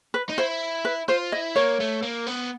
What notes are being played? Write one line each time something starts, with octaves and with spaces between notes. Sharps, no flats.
B4
D#4
E4 C5
B4
F4 C5
E4 D#5
A#3 C#5
A3
A#3
B3